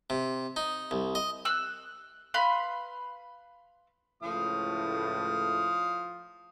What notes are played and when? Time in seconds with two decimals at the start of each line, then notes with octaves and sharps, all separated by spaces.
0.10 C3
0.56 D#4
0.91 C2
1.15 D#5
1.45 E6 F#6
2.34 B4 F5 B5 C6
4.23 C#2 A2 F3 F5 D#6